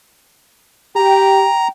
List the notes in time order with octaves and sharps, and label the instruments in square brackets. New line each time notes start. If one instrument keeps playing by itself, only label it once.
[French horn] G4 [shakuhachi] G5 [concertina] A#5